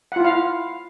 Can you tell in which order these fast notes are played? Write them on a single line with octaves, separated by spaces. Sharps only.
F#5 F4 E4 F5